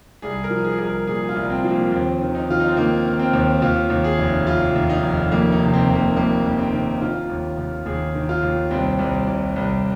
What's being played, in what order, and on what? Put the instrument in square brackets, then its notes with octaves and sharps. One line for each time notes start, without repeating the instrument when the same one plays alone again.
[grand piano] C2 G#4
A#4
F3
G#4
C2 G#4
A#4
A#2 G#4
F4
C2
C4
F3
A#3
D#2 C4
D#3
D#4
D#3 F4
D#4
C4
D#3 A#3
D#3
C4
D#2
D#2 F4
D#2
G#4
F1
F1 F4
D#2
D#4
F1
F2 A#3
D#4
C3
C4
F1
A#3
F2 A#3
F2
C4
D#3
D#3 F4
D#2
D#2
D#2 G#4
D#3
F4
D#2
C2 C4
C2
C2
C2